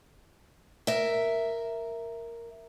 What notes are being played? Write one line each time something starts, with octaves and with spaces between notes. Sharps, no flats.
A#4 E5